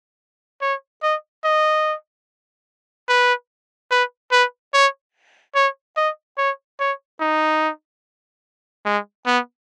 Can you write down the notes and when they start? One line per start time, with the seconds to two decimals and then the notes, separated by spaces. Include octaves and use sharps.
0.62 C#5
1.03 D#5
1.44 D#5
3.09 B4
3.91 B4
4.32 B4
4.74 C#5
5.55 C#5
5.97 D#5
6.38 C#5
6.79 C#5
7.20 D#4
8.85 G#3
9.26 B3